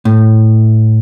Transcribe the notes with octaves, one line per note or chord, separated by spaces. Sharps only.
A2